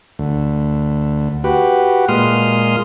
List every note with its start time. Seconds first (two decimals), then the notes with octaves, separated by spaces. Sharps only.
0.19 D2
1.44 F#4 G4 B4
2.09 A#2 G#3 C6 D#6 F6